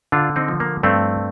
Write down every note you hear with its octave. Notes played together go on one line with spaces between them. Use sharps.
D3 D4 F4
C4 D#4
F3
A#3
G2 A3 C4